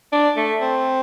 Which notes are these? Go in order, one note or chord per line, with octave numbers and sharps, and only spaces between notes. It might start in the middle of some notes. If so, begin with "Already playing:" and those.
D4
A3
C4